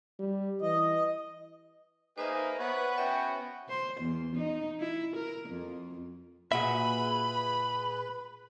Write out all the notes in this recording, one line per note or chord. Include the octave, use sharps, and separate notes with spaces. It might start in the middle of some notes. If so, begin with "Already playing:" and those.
G3
E3 D#5
A#3 D#4 G#4 B4 C5 E5
B3 B4 C#5
C#4 F#4 C#5 E5 F#5 G5
C5
E2
D#4
E4
A#4
F2
A#2 F#4 G#4 B4 E5 B5